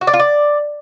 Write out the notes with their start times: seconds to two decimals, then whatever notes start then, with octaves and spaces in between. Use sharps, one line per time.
0.01 F#4
0.07 D5
0.13 F4
0.19 D5